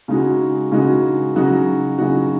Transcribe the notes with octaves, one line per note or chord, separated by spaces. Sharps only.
C#3 G#3 D#4 F#4
C#3 G#3 D#4 F#4
C#3 F#3 D#4 F#4
C#3 F#3 D#4 F#4